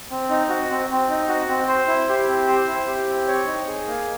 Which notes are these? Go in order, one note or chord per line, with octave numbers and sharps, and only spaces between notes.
C4
D#4
F#4
C4
C4
D#4
F#4
C4
C5
E4
G4
C4
C5
E4
G4
C4
C#5
D#4
G#4
A#3